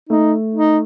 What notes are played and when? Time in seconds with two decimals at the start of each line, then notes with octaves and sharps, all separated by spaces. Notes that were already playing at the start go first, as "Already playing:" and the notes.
0.10 A3 D#4
0.55 D#4